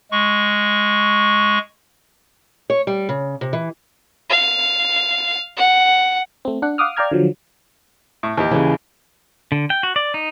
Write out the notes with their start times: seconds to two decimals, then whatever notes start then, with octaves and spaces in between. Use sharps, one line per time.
0.12 G#3 C#6
2.70 C#5
2.87 G3
3.09 C#3
3.41 C3
3.53 E3
4.30 F5
5.57 F#5
6.45 A3 C4
6.62 D4 F#5
6.78 F5 F#5 D6 D#6 F6
6.97 D5 F5 G5 A#5 F6 G#6
7.11 D3 F3 F#3
8.23 A2
8.37 D#2 E3 G4
8.51 C#3 E3
9.52 D3
9.70 G5
9.83 F#4
9.96 D5
10.14 D#4